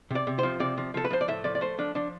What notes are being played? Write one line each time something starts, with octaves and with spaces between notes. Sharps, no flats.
C3 D5
C3
F3 C5
C3 D5
F3
F3 A4
B4
F3 C5
D5
A2 E5
F3 D5
D5
A3 C5
F3 D4
F3 D4